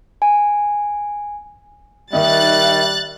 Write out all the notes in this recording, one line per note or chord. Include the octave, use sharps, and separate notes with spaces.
G#5
D#3 G3 D#4 E5 F#6 A6